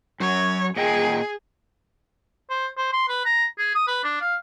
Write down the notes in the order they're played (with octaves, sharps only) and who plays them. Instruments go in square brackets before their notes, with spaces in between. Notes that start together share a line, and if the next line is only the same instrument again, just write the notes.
[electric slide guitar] F#2 F#3 [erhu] C#5
[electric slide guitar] A#2 D#5 G5 [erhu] G#4
[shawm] C5
C5
C6
B4
A#5
G#4
D#6
B4
D4
F5